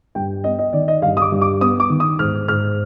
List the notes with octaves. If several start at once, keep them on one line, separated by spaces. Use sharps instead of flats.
G2 G5
B3 D#5
D#5
D#3 D5
D#5
G2 F5
D#6
D6
G2
D6
B3 D#6
D6
D#3
D#6
G#2 F6
G#2 F6